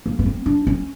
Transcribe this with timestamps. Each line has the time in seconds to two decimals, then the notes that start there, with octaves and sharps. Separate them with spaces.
0.06 A#3
0.19 B3
0.26 C4
0.46 D4
0.67 C#4